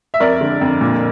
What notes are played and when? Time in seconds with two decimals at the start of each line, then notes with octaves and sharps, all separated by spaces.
0.14 E5
0.20 F2 A#4 D5
0.41 D3
0.61 F2
0.81 A#2